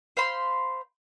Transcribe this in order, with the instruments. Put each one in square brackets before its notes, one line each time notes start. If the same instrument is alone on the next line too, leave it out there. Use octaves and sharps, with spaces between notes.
[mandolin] C5 F5 B5 C6